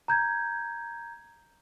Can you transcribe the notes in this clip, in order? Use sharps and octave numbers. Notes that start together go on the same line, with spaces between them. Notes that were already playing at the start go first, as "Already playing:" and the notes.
A#5 G6 G#6